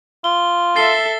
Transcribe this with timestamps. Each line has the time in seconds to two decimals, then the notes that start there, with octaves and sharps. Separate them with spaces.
0.24 F4 G7
0.76 A4 E5 A6 C7 G7